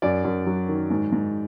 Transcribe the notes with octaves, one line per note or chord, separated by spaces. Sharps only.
F#2 D5
F#2
F#3
D#3
G#2
G#2